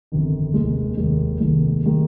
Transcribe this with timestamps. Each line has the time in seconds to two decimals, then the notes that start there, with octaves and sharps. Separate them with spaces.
0.12 G1 F2 D#3
0.54 F1 D#2 D#3 G#3
0.97 F1 D#2 D#3 G#3
1.40 F1 D#2 D#3 G#3
1.85 D#3 G#3